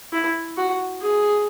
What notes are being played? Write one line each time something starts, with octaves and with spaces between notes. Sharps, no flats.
E4
F#4
G#4